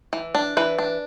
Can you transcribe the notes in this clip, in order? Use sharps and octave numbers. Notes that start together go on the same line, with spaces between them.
E3
D4
E3 B4
D4